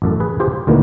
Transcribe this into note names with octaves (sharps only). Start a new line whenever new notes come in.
A1 F#2 A4
G#4 B4
F4 G4 G#4 C5
G5
D2 A#2 D#3 E3 A#3 B3